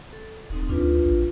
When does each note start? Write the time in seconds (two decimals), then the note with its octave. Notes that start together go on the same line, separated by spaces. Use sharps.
0.13 A4
0.50 D#1 C4 D#4 A4
0.69 D2 D4 F4 B4
1.06 A#1